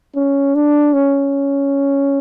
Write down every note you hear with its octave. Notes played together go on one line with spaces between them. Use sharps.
C#4
D4
C#4